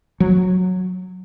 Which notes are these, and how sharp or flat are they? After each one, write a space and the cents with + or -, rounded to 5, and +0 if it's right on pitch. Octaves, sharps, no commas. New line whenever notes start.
F#3 -10